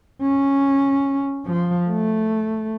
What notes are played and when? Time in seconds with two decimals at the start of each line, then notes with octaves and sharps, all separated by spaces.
0.22 C#4
1.46 F3
1.89 A3